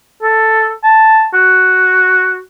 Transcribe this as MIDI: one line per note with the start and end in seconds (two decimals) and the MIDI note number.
0.23 0.71 69
0.84 1.26 81
1.34 2.39 66